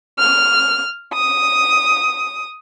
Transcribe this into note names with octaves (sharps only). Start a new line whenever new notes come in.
F6
D#6